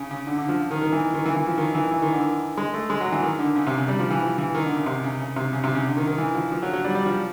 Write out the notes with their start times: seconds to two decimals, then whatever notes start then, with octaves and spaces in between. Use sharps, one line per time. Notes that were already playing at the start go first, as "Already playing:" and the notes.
Already playing: C#3
0.11 C#3
0.27 D3
0.38 D3
0.49 F3
0.71 D#3
0.81 D#3
0.92 E3
1.14 D#3
1.26 E3
1.36 E3
1.47 F3
1.58 D#3
1.75 E3
1.91 E3
2.02 D#3
2.13 D3
2.57 G#3
2.74 A3
2.90 G#3
3.01 F#3
3.12 E3
3.23 D#3
3.39 D3
3.56 C#3
3.67 C3
3.78 C#3
3.88 G3
3.99 F3
4.10 E3
4.21 F3
4.38 E3
4.55 D#3
4.66 D3
4.76 C#3
4.86 C3
5.04 C#3
5.20 C#3
5.36 C3
5.53 C#3
5.64 C3
5.75 C#3
5.86 D3
5.97 D#3
6.07 D#3
6.18 E3
6.35 F3
6.52 F3
6.62 F#3
6.73 F#3
6.84 G3
6.95 G3
7.06 F3